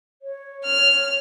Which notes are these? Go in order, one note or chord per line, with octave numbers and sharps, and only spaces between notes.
C#5
F6